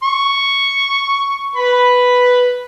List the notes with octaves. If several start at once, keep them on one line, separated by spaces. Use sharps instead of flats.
C#6
B4 B5